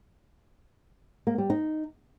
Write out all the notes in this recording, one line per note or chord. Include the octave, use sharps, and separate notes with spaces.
A#3
G3
D#4